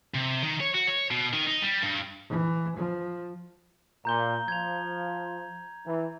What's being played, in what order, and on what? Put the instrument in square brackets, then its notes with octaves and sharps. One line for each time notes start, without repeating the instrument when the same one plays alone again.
[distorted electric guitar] C3
D#3
C#5
F#4
C#5
B2
D#3
D#4
G3
G2
[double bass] E3
F3
[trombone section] A#2 [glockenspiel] A#5 G6 G7
[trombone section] F3 [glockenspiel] G#6 F7
[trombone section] E3